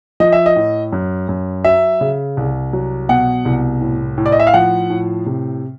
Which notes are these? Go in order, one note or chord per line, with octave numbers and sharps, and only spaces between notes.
F3 D#5
E5
D#5
A2
F#2
F#2
F#3 E5
C#3
C2
F#3
B2 F#5
C2
A2
A2
D5
D#5
E5
F5
F3 F#5
A2
C3